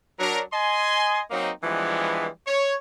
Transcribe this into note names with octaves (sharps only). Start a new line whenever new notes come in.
F#3 D4 A#4
D#5 G#5 C6
F#3 A#3 C4 D#4
E3 F3 G3 G#3 B3 D4
C#5